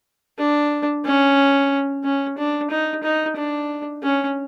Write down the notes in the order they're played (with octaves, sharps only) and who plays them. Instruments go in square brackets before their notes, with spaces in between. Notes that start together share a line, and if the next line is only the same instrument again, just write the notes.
[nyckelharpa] D4
C#4
C#4
D4
D#4
D#4
D4
C#4